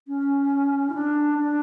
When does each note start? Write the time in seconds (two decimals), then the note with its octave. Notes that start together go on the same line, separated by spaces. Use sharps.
0.08 C#4
0.90 E4
0.94 D4
1.39 D4